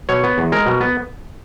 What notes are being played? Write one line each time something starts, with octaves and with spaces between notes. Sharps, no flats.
B2 C#5
B3
E2
G#3 A#4
B2
B3